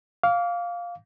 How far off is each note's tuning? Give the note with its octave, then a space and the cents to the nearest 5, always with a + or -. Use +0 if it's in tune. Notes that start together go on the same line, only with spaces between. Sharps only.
F5 +5 D6 -35